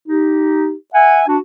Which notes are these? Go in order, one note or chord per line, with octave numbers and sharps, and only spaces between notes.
D#4 G4
E5 F#5 G#5
D4 F#4